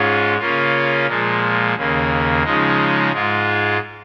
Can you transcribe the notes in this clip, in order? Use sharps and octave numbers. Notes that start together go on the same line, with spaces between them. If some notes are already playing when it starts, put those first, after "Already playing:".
Already playing: G#2 G#3 C#4 F4
C#3 A#3 C#4 F4
A#2 F3 G#3
D#2 C#3 A#3
C#3 F3 G#3 D#4
G#2 G#3 F4